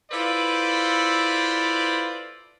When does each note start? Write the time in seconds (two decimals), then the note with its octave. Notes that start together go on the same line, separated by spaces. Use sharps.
0.12 E4 F4 A4 B4 C5 D5